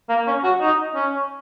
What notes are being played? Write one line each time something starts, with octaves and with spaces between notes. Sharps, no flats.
A#3
C#4
F#4
D#4
C#4